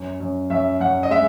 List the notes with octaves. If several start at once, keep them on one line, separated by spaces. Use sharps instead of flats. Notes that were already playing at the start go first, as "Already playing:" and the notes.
Already playing: F#2
F#2
F#2 E5
F#2 F#5
D#5
G#3 E5